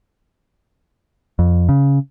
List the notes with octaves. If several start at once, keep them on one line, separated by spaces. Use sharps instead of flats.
F2
C#3